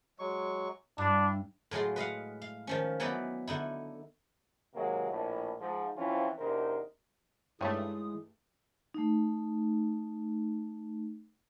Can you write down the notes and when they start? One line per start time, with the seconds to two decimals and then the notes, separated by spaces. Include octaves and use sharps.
0.19 F#3 G#3 C#6
0.98 G2 D4 E4
1.71 A2 F#3 G#3 F4
1.96 B4 D#5 F5 F#5
2.42 F5
2.67 D#3 F3 C#4
3.00 E3 F#3 B3 D#4 B4 D5
3.47 D3 D#4 E4
4.73 C3 D#3 F#3 G#3 A#3
5.10 A#1 A2
5.59 G#2 F3
5.96 E3 F3 C4 C#4 E4 F4
6.38 E2 C3 D4 D#4 A#4 C5
7.61 G2 E3 G#3 A3 D#4 C#5 D#6
8.94 A3 D#4